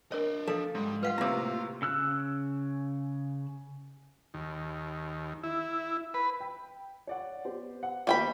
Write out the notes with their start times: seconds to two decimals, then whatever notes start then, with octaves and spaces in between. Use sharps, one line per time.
0.12 D4 A#4 C#5 D#5
0.47 F3 A4
0.75 G#2 G3
1.03 F4 B4 F5 F#5
1.18 A2 C3 A#3 A#5
1.82 C#3 E6 F#6
4.34 D#2
5.44 E4
6.14 B4
6.40 G5
7.07 C#5 D5 F#5
7.45 B3 G4 C5
7.83 F#5
8.07 D#2 G3 B3 G5 B5